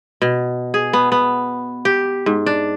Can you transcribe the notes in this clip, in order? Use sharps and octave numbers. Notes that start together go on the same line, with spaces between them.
B2
G#4
B3
B3
G4
G#2
D4